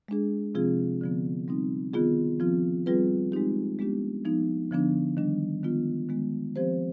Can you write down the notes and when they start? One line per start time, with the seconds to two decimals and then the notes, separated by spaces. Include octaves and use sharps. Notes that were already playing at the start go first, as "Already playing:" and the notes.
0.08 G#3 D4 G#4
0.55 C3 F3 C4 F4 G#4
1.01 D3 F3 B3
1.48 G3 C4 D#4
1.94 D#3 B3 F4 G#4
2.40 F3 C4 F4
2.86 G3 C4 F4 G#4 B4
3.32 G#3 C4 D#4 G4
3.79 G#3 B3 D4 G4
4.25 F3 B3 D#4
4.71 D3 F3 B3 D4
5.17 D#3 G3 D4
5.63 D#3 G#3 B3 F4
6.09 D#3 G#3 B3
6.56 F3 C4 G4 C5